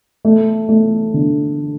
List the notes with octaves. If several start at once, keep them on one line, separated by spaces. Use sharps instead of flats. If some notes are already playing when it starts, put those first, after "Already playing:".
A3
A3
D3